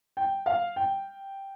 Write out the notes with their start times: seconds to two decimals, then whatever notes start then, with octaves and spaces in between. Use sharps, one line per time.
0.17 G5
0.46 F5
0.76 G5